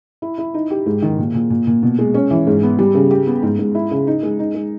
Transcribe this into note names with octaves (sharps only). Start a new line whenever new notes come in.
E4
E4
D#4
G4
G#2
D#3
A#2
A#2
A#2
A#2
B2
G#3
C#4
E3
G#2
B3
G3
C#3
G4
B3
G#2
G#2
E4
C#3
D#4
G#3
D#4
G#3